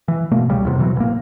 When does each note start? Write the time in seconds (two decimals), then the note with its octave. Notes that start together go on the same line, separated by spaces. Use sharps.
0.08 E3
0.31 G#1 B2 A3 A#3
0.50 C#2 C#3 G3
0.63 D1 E2 C3
0.78 F2 B2 E3 F#3
0.96 A1 A#3